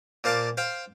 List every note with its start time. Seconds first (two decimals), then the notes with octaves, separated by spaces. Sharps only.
0.24 A#2 C5 F5 A5 C6 D6
0.57 C5 F5 G5 C6